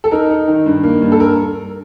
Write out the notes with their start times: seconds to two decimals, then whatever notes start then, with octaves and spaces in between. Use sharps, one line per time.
0.04 A4
0.11 D#4 A#4
0.29 D#4
0.48 D#3
0.66 G2
0.83 A#3
1.02 G2
1.12 A4
1.20 A#4